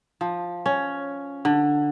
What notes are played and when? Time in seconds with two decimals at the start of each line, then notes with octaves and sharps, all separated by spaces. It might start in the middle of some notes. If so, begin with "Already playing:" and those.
0.21 F3
0.66 C#4
1.45 D3